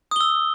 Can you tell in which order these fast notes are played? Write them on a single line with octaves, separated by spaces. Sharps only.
D#6 G7 E6